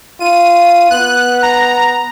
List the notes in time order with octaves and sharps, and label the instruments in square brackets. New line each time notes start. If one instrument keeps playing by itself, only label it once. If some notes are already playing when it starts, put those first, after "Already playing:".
[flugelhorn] F4 [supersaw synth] D#7
[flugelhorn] B3 [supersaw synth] F#6
[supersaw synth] A#5